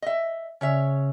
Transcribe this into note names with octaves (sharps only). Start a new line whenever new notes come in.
D#5 E5
C#3 C#4 C#5 E5